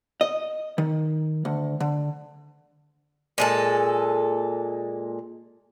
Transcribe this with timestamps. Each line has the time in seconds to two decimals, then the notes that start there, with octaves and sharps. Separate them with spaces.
0.21 D#5
0.78 D#3
1.45 D2
1.80 D3
3.38 A#2 G#3 A4